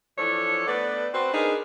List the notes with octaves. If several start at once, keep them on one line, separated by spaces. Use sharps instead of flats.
E3 F3 D4 A4 C#5
A3 B3 D4 B4 D5
C4 F#4 B4 C5
D4 D#4 G#4 A#4 B4